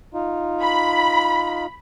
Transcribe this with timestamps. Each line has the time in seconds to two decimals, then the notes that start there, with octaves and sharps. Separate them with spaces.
0.14 D#4 F4
0.62 B5